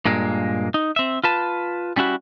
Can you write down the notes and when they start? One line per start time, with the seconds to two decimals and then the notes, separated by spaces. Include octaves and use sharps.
0.05 G2 A#2 G#3 A#3
0.74 D#4
0.96 C4 E5
1.24 F4 B4 A5
1.96 G3 C#4 E4 F#4